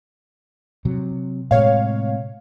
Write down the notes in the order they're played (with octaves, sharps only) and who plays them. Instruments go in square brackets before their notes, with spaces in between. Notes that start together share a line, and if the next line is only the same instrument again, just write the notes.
[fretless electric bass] C3 F#3
[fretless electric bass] A2 C3 G#3 [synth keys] C#5 F5